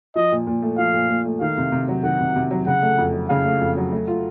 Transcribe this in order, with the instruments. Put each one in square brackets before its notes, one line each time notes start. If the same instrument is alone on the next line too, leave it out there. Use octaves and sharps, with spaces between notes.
[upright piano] F3 [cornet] D#5
[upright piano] A#2
A#2
A3
[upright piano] F3 [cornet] F5
[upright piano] A#2
A#2
A3
[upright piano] D#3 [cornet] F5
[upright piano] C3
C3
F#3
[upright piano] D#3 [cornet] F#5
[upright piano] C3
C3
F#3
[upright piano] C#3 [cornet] F#5
[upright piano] A3
F2
F#3
[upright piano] C#3 [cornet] F5
[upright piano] A3
F2
F#3
A3
F4